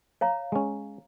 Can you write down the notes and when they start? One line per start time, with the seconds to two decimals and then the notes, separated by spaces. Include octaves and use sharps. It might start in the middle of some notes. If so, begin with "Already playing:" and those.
0.21 C#5 F5 A#5
0.52 G#3 C#4